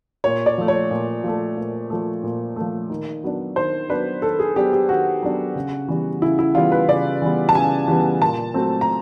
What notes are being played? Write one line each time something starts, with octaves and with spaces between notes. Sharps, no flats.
A#2 C#5
D5
F3 A3
C#5
A#2
F3 A3
A#2
F3 A3
A#2
F3 A3
D#3
F#3 B3 D4
D#3 C5
F#3 B3 D4 B4
D#3 A4
G#4
F#3 B3 D4 G4
G4
D#3 F#4
F#3 B3 D4
C#3
E3 G3 B3
C#3 E4
E4
E3 G3 B3 F4
B4
C#3 D5
E3 G3 B3
A5
C#3 G#5
E3 G3 B3
A#2 A5
F#3 A3 C4
A#5